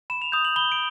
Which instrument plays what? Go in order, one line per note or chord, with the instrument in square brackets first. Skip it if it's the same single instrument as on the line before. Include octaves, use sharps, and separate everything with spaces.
[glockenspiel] B5 E7
F7
D#6 G6 F7
F#7
B5 G7
D7